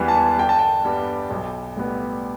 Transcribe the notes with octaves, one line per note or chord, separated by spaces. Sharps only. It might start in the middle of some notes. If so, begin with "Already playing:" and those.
Already playing: E2 E3 G3 B3 B5
A5
G1 G5
A5
G5
G2 G3 B3
B1
A2 G3 B3